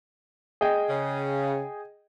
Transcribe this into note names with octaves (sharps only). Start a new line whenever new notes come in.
G#4 D#5 G5
C#3